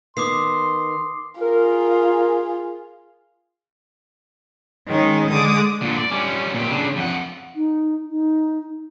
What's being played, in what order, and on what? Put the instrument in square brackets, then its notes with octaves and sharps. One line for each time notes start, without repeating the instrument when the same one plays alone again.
[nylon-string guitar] D#3 B3 [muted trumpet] C6 [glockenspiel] D6 D#6 C7
[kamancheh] F4 G#4 [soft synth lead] A#4
[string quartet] D#3 G#3 C#4 D#4
D3 G#3 D6 D#6
[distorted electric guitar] A#2 D3
D5
G3 C#4
A#2 G4
C#3 D4
F2 F#5
[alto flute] D#4
D#4